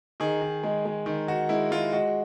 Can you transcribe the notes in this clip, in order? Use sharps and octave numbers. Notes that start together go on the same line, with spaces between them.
D#3 G#4
D#3
G#3
G#3
D#3
D#3 F#4
G#3 E4
G#3 F4
G#3 F#4